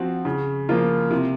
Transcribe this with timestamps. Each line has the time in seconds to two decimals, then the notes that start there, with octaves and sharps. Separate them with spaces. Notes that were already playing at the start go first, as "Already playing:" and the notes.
Already playing: F3 C4 F#4
0.25 C#3
0.69 F3 A#3 F4 A#4
1.11 C3